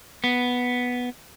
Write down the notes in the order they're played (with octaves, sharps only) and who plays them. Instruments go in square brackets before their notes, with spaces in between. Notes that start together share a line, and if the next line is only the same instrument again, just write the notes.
[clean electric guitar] B3